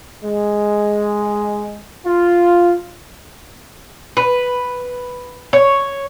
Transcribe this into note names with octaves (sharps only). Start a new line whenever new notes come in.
G#3
F4
B4
C#5